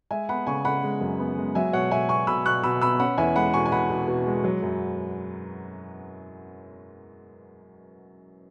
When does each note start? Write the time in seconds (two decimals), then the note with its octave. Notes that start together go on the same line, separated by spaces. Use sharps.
0.11 G#3 E5 G#5
0.29 B3 F#5 B5
0.47 C#3 G#5 C#6
0.65 C#3 F#5 B5
0.83 G#3
1.01 F#2
1.19 B3
1.37 G#3
1.55 F#3 E5 G#5
1.73 B2 C#5 F#5
1.91 B2 E5 G#5
2.09 B2 G#5 C#6
2.27 B2 B5 E6
2.46 B2 C#6 F#6
2.63 B2 B5 E6
2.81 B3 B5 E6
3.00 C#4 F#5 B5
3.18 E2 E5 G#5
3.36 G#3 F#5 B5
3.54 B2 G#5 C#6
3.66 G#5
3.72 B2 F#5 B5
3.90 B2
4.08 B2
4.26 G#3
4.44 F#3
4.62 F#2